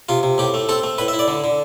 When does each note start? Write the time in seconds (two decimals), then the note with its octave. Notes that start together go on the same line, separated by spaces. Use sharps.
0.09 C3 F4
0.23 C3
0.38 A2 G4
0.54 A3
0.69 C4 A4
0.83 A3
0.98 A2 B4
1.08 E5
1.13 E4
1.19 D5
1.28 D3
1.44 D3